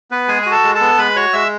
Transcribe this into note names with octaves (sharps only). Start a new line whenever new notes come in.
B3 B4
G#3 G#4 G#5
F#4 G#5
A4 A5
G#3
A4 A5
B3
G#3 B4 B5
F#4 C#5 C#6
G#3 E5 E6